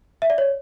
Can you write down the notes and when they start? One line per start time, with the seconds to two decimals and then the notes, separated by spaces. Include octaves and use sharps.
0.22 E5
0.30 D5
0.38 C#5